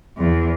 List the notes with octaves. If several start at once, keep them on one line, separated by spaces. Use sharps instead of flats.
E2